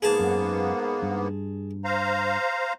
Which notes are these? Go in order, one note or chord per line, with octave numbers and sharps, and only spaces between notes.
G#2 A#3 B3 G#4 A5
F#2
G2
C5 F5 A#5